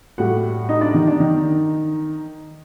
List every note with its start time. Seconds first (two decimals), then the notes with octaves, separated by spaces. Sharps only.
0.18 A2 G3 F#4 F#5
0.69 D#4 D#5
0.81 D4 D5
0.94 D#3 D#4
1.07 D4
1.20 D#3 D#4